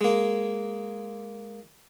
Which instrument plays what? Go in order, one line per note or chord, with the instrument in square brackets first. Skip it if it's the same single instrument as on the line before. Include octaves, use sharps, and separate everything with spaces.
[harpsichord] G#3 A#3